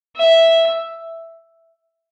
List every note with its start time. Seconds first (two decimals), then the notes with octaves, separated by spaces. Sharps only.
0.16 E5